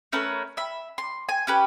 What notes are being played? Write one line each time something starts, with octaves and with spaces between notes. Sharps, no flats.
A3 C#4 A#4 B4
E5 B5
C6
G#5
C#4 G4 B4